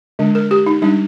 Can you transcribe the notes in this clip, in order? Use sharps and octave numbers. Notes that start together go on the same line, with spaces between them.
D3 G#3 D4
A#4
G4
D#4
G3 D4 D#4